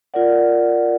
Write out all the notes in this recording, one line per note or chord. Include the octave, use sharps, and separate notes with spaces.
F4 A#4 D5 F#5